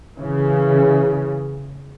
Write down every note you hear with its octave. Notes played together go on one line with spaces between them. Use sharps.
C#3 E3